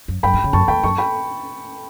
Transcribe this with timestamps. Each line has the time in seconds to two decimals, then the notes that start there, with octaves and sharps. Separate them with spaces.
0.08 F#2
0.23 F#2 G5 B5
0.34 G2
0.44 C#3
0.53 F#2 A5 C#6
0.68 E2 G5 B5
0.83 F#2 A5 C#6
0.98 G5 B5